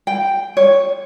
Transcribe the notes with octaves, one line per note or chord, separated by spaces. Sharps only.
G5
C#5